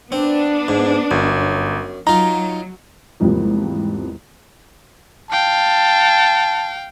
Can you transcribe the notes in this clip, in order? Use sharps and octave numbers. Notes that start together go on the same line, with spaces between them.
B3 C4 D4
G#2
G1 F#2
F#3 D#4 F4 A#5
E2 G#2 C3 F3 G3 A#3
F5 G5 A5